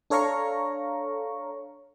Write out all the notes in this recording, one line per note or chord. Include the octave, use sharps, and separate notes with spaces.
D4 A4 C#5 F5 A#5 C#6